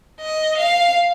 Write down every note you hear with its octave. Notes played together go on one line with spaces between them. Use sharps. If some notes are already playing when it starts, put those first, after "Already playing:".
D#5
F5